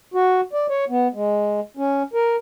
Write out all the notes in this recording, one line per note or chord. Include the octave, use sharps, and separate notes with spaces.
F#4
D5
C#5
B3
G#3
C#4
A#4